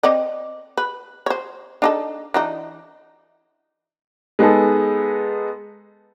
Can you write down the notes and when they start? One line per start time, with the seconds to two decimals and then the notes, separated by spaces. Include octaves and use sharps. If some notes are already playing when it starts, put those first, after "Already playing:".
0.03 C4 D5 D#5
0.77 B4
1.26 C5 C#5
1.82 D4 D#4 A4
2.34 E3 D4 D#4
4.39 G#3 B3 D#4 G#4 A4